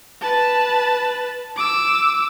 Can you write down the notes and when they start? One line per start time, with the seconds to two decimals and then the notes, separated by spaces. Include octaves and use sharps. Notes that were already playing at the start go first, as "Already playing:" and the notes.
0.21 B4 A5
1.56 D6 E6